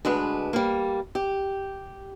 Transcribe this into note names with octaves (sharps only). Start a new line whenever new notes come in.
D2 G#3 D4 B4
G3 A#3
G4